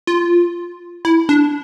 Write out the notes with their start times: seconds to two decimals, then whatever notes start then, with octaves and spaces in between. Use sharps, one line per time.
0.07 F4
1.05 E4
1.29 D4